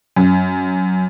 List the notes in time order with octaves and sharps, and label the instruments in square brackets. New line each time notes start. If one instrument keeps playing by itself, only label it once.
[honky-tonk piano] F#2